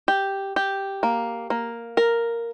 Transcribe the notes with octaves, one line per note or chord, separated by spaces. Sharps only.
G4
G4
A#3
A#3
A#4